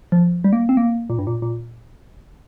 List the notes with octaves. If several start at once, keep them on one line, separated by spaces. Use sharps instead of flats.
F3
G3
A#3
C4
A#3
A#2
G2
A#2
A#2